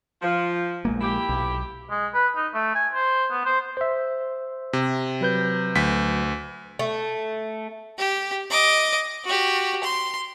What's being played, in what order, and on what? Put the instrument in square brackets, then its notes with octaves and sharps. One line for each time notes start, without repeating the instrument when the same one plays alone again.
[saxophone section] F3
[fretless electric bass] A#1 G#3 A#3
[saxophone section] E4 G4
[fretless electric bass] B1
[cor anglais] G#3
B4
D#4
A3
G#5
C5
B3
C5
[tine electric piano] C5 E5
[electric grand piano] C3
[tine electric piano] F#3 B4 G6
[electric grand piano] D2 B6
[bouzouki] A3
[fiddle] G4
D#5 D6
F#4 G4
C6